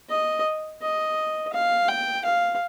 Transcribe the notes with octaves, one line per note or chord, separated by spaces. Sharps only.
D#5
D#5
F5
G5
F5